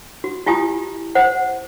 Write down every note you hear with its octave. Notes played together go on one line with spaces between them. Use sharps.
F#4
E4 F4 G4 G#5 D#6
C5 F#5